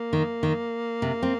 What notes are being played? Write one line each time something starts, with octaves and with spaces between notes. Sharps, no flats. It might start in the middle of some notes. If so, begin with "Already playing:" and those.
Already playing: A#3
D#3
D#3
C3
C4